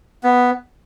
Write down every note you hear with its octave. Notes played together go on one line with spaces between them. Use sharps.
B3